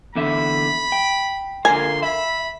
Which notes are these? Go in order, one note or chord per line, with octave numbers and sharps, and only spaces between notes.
E2 D3 E5 B5
G5
D3 F4 A#4 G#5 C6
E5 B5